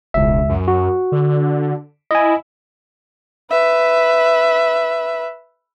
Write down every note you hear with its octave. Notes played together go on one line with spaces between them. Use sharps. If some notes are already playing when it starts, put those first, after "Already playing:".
E1 C#2 E5
F#2
F#4
D3
E4 D#5 G#5
B4 E5